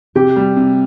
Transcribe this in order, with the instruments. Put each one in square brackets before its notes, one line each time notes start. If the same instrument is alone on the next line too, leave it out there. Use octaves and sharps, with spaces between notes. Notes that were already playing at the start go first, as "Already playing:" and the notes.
[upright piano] C3 [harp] G4
[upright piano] G3
C3